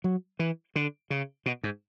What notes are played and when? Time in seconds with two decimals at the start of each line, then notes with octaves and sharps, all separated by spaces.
0.04 F#3
0.39 E3
0.76 D3
1.10 C#3
1.46 B2
1.64 G#2